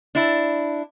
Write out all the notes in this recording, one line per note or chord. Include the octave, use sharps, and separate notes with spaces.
D4 E4